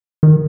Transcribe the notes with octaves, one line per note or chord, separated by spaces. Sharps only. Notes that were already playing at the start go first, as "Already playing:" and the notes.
D#3